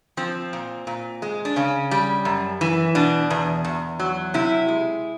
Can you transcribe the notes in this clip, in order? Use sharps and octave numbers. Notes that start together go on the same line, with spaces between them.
F3 C4
A#2
A#2
G#3
D4
C#3 C#4
G3
F#2
E3
B2 D4
E2
E2
F#3
C3 E4
G#3